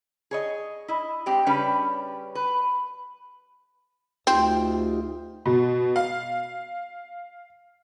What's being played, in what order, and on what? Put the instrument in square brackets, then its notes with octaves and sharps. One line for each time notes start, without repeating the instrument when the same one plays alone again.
[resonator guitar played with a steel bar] G#4 C#5 D#5
E4 D#5
G#3 C4 G4
C#3 G3 C#4 D4 G4 B4
B4
[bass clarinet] D2 [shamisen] C4 [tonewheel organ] D#4 F4 G4
[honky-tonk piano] B2
F5